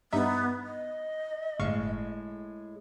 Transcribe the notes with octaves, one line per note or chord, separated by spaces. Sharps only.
G2 B3 D#4 E5
D#5
G1 A2 G#3 F5 C#6